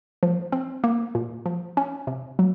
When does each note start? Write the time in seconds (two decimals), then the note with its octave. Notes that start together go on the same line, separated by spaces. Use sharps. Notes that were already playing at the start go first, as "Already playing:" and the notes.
0.23 F3
0.52 C4
0.84 A#3
1.15 A#2
1.46 F3
1.77 C#4
2.07 C3
2.39 F#3